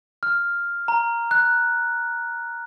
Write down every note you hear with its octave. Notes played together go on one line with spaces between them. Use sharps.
F6
A#5
F#6